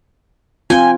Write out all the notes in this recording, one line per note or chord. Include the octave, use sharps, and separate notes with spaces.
C4 F4 G5 G#5